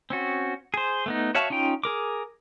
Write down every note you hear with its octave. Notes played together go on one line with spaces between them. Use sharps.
C4 C#4 F#4
G#4 C5
A3 B3 D#4
F#4 C#5 E5 F5 A5
C#4 D#4 F4 G5
G#4 A#4 D6